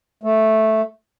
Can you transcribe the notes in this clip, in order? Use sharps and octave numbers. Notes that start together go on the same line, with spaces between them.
A3